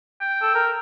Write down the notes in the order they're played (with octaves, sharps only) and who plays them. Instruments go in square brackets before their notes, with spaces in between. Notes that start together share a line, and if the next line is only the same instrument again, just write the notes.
[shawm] G5
[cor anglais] A4
A#4